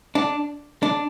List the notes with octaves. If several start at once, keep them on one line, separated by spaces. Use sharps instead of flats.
D4
D4